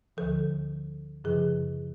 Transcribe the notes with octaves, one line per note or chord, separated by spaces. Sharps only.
D2 D3 F3 A4
F#2 C#3 F3 G#4